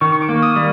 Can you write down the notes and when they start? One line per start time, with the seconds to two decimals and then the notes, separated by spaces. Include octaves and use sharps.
0.01 D#3 C#6
0.12 C#6
0.22 D6
0.29 A#3
0.42 D#6
0.56 G3